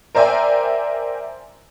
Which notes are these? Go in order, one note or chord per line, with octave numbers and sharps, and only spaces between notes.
A#4 C5 D5 E5 G5 G#5